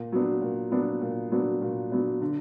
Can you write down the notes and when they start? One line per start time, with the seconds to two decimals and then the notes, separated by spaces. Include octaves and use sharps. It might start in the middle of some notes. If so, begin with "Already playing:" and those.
Already playing: A#2
0.12 F#3 B3 D4
0.42 A#2
0.72 F#3 B3 D4
1.02 A#2
1.32 F#3 B3 D4
1.62 A#2
1.91 F#3 B3 D4
2.21 D3